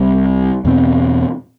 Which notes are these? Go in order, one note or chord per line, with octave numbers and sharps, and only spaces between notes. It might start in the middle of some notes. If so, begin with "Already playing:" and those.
Already playing: C2 C3 G3
E2 B2 A3 C4